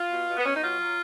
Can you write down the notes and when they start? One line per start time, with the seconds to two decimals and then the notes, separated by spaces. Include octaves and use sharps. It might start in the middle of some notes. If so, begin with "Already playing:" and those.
Already playing: F4
0.11 B2
0.28 B2
0.37 B3
0.45 B2 C#4
0.54 D#4
0.62 F#3 F4
0.79 F#3